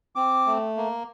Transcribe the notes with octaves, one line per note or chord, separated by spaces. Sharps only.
C4 D6
A3
A#3